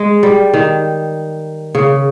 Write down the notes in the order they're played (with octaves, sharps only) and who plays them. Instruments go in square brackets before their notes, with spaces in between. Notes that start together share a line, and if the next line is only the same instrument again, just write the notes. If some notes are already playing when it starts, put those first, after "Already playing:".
Already playing: [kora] G#3
G3
D#3
C#3